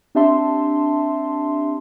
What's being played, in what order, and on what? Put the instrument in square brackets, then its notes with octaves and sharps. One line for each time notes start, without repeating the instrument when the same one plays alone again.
[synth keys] C4 D4 G4 E5 A5 C6